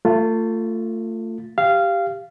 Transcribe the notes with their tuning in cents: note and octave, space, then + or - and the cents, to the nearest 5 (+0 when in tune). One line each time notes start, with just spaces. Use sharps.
A3 +30 F4 +0
G4 +0 F5 -15